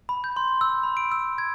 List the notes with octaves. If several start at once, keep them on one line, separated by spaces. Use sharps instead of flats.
B5
G6
C6
E6
B5
D7
E6
G#6